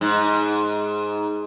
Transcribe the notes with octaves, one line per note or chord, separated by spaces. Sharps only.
G#2